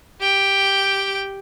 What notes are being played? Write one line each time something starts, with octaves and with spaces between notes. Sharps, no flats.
G4 G5